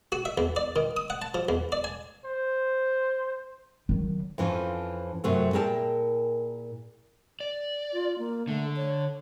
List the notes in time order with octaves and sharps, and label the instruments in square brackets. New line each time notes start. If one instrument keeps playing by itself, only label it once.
[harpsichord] F#4
E5
E2
D5
D#3
D#6
F#5
A5
F3
E2
D5
G#5
[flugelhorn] C5
[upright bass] D#3 F#3
[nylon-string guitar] F2 E3 F3 C#4
F#2 C3 F#3 A3
A#2 E4 G#4 A#4 G5 A5
[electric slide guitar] D5
[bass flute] F4
A#3
[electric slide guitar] D3 [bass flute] A3
[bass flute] C#5